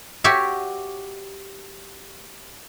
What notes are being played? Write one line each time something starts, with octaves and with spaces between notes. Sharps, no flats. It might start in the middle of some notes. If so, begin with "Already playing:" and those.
F#4 G4 C#5 E5